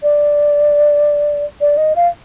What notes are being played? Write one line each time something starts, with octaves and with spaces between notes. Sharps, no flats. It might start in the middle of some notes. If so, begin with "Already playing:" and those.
D5
D5
D#5
F5